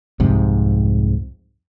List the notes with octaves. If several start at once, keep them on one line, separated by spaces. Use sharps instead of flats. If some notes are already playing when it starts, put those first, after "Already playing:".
C2 F2 G#2 C3